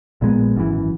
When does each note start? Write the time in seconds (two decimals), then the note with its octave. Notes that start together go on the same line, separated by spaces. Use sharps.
0.21 A#1 A#2 G#3 B3
0.56 G#1 F#2 C#3 E3